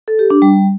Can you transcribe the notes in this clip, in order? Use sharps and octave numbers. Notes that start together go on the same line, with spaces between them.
A4
G4
D4
G3